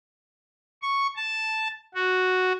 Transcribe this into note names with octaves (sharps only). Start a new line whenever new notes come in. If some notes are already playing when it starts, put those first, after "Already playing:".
C#6
A5
F#4